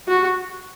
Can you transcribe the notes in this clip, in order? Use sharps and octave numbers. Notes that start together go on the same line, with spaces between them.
F#4